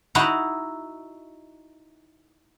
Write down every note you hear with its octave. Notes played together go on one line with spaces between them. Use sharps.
D#4 E4 F#4